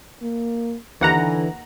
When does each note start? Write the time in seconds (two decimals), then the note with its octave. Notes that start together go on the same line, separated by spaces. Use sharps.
0.22 A#3
1.01 D#2 D3 E3 F#5 A#5